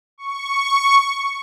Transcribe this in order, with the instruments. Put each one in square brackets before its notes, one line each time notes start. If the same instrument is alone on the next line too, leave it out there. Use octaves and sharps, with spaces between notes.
[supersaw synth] C#6